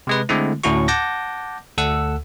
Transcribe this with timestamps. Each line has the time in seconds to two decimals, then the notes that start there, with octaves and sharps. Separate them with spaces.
0.07 C3 G#3 B4
0.29 D3 G#3 A3 C4 E4
0.64 D2 A2 C#4 E4 F#4 C#6
0.88 F#5 A5 D6 G6 A#6
1.78 D2 A4 F#5 E6